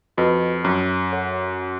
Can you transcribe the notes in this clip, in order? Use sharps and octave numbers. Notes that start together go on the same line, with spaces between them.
F2 F#4 B4 D#5
F#2
A4 C#5 F#5